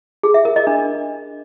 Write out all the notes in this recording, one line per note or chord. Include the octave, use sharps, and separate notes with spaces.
G#4
E5
A#4
D#5
D4